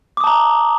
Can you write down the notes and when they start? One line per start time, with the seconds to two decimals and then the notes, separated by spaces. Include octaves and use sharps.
0.17 D6
0.20 D#6
0.24 A5
0.27 A#5